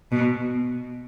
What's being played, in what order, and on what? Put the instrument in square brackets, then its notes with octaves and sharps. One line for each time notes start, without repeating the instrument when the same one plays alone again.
[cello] B2